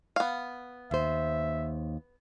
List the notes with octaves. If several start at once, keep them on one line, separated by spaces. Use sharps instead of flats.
B3 F5
D#2 C5 E5